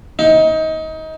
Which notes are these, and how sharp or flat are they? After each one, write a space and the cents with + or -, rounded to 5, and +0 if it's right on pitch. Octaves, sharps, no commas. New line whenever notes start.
D#4 +25